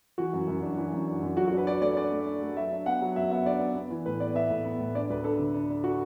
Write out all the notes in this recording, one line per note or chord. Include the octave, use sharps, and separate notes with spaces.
E3 F#4
F#2
F#2
D4
E3
F#2
D4
F#2
F#3 F#4
F#4
D4 B4
D4 D5
A3 D5
D4 D5
A3
D4
A3
F#3 E5
D4
B3 F#5
F#3
F#2 E5
B3 E5
D4 D5
B3
B3
E3
A2 B4
B3 D5
B3 E5
A2
B3
A2
D4 D5
D2 B4
D4 A4
D3
D4
D4
F#4